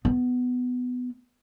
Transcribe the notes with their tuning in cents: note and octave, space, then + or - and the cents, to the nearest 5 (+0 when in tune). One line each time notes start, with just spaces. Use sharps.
B3 +10